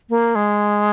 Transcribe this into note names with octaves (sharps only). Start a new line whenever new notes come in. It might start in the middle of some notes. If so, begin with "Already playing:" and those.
A#3
G#3